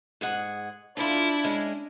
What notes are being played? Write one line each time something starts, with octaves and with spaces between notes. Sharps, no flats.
G#2 G#4 F#5
D3 D4 E4 F4
G#3 C#4